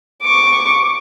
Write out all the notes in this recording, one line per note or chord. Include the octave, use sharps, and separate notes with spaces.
C#6 D6